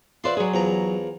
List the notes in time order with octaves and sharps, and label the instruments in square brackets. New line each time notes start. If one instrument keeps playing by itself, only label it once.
[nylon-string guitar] F4 C5 E5 [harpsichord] B4 D5 C6
[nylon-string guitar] F#3 G#4
[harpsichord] E2 F3 A#5